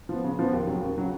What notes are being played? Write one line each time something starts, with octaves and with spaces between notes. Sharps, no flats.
F3 B3
C#3
F3 B3
D#2
C#3 F#3
D#2
C#3 F#3